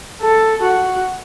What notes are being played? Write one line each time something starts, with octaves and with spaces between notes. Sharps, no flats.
A4
F#4